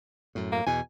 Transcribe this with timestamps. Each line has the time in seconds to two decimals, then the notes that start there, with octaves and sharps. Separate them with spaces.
0.35 F#2 A2
0.52 A#3
0.66 E2 B2 G#5